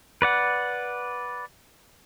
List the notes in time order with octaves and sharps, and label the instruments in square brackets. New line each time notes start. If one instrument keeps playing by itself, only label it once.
[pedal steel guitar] B4 D5 F#5